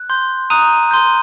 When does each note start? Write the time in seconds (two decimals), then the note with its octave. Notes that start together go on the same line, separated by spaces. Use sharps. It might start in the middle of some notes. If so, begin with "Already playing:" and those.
Already playing: F#6
0.10 C6 G6
0.50 A#5 D#6 F#6 D#7
0.91 C6 G6